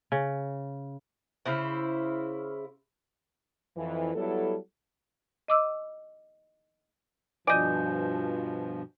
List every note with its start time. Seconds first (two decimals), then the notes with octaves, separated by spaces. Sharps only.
0.12 C#3
1.45 C#3 E4 C5
3.76 F2 E3
4.15 F#3 G3 B3 E4 A4
5.48 D#5 D6 E6
7.47 G2 B2 F3 D5 D#5 G#5 G6